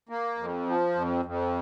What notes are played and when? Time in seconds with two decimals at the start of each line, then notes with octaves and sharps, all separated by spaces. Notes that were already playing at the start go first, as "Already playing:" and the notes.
0.09 A#3
0.38 F2
0.66 F3
0.95 F2
1.25 F2